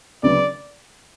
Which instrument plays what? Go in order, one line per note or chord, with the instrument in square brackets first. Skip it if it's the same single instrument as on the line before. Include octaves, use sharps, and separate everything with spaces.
[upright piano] D2 C#3 F#3 B3 [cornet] D5